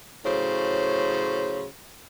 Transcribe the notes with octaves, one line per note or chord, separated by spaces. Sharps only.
A2 C#3 F#3 C5